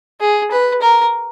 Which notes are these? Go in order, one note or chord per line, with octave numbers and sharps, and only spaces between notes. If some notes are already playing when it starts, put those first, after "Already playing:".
G#4
B4
A#4